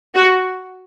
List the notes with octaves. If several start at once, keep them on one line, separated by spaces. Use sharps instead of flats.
F#4